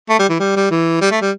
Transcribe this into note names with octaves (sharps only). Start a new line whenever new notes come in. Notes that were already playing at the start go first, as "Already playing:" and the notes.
A3
G3
E3
G3
G3
E3
G3
A3
G3